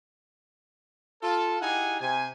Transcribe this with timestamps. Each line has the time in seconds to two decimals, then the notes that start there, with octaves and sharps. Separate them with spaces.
1.22 F4 A4
1.61 D#4 E4 G4 G#4 F#5 G#5
2.00 C3 G#5